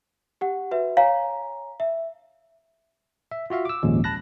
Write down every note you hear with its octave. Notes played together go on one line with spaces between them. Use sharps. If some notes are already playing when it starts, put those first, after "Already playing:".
G4 F#5
F#4 B4 E5
C#5 F5 G#5 A#5
E5
E5
F4 F#4 E5 F5
D6 E6
G#1 D#2 A#2 F3 G#3 C#4
A5 B5 F#6 A#6